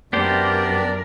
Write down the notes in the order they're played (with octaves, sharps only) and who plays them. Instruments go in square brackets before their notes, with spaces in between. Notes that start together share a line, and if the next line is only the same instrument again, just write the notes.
[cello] F#2 A#4 [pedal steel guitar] B3 G4 C5 [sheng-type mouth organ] D4 D5